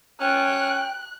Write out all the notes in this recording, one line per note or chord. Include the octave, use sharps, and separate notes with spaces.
C#4 G5 F#6